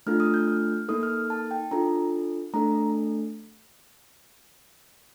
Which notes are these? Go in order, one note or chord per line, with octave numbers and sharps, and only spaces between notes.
A3 D4 F4 A4 F6
D#6
G6
F6
A#3 D#4 A4 D#6
F6
A5
G5
D4 F4 A4 A#5
A3 D4 A4 A#5